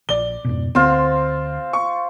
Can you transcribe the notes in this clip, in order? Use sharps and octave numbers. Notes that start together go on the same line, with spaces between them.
A#1 D5 G7
F2 G#2 B2
D2 C4 F4 C5
C#6